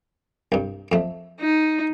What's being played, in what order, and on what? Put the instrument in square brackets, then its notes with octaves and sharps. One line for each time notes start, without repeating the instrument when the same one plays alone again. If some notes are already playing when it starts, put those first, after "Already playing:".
[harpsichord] C2 G2
F2 A3
[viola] D#4